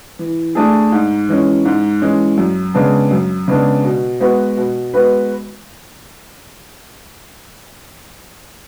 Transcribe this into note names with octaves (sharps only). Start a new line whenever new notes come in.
E3
A3 D4 G#4
G#2
E3 G#3 C#4
G#2
E3 G#3 C#4
F#2
C#3 G#3 B3 D4
F#2
C#3 G#3 B3 D4
B2
G#3 B3 F#4 B4
B2
G#3 B3 F#4 B4